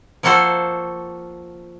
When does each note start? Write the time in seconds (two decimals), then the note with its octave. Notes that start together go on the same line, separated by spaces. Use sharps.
0.23 F3 A#3 F#4 A4 C5